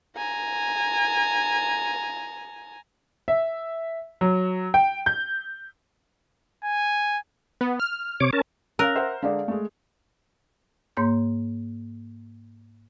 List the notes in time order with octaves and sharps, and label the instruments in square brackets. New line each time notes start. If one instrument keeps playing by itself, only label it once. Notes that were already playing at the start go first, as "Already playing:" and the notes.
[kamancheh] G#5 A#5
[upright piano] E5
F#3
G5
G6
[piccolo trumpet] G#5
[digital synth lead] B3
F6
[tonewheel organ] C3 C#5 D6
C#4 A#4 A5
[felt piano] C#4 F5 [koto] A#4 [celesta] E6 F#6 A#6
[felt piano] C5 E5 F#5
[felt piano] D3 G#3 D4 [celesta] D5 F5
[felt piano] G#3 A3
[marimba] G#2 A#3 C#5 C6 G6